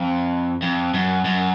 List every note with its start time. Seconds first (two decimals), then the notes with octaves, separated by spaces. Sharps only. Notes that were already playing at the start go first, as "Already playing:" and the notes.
Already playing: F2
0.62 F2
0.94 F#2
1.25 F#2